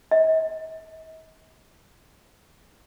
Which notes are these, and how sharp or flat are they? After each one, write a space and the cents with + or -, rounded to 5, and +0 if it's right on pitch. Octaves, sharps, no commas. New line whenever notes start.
D#5 +45